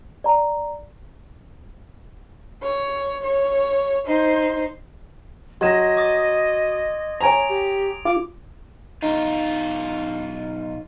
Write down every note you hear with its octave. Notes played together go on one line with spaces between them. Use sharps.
D5 A#5
C#5
C#5
D#4 C5
F#3 D#5 C6 G#6 A#6 E7
D6 D#6 A6
C#5 G#5 A#5 D7 F7
G4
F4 D6
B1 D#4 F4